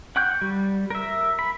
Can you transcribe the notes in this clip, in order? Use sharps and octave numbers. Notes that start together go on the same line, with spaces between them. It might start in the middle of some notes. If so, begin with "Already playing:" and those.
F#5 G5 C#6 F#6 G6
G3
A#4 E5
B5